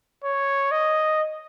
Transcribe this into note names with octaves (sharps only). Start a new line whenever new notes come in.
C#5
D#5